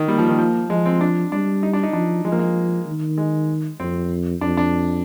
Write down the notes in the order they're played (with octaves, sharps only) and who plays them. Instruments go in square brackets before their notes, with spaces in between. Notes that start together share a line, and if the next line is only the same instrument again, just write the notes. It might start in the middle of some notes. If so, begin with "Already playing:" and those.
Already playing: [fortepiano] D#3
[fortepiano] G3 [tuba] A#3
[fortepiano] F3
D#3
F3
[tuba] F3 [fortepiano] G#3
[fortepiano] C4
D4
[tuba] G3 [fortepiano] D4
[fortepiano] D#4
D4
D#4
[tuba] F3 [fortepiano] D4
[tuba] F3 [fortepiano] G#3
[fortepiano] A#3
G#3
[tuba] D#3
[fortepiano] G#3
[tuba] F2 [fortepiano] C4
[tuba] F2 [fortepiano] D4
[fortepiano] D4